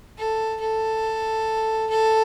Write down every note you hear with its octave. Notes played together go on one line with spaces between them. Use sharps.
A4
A4
A4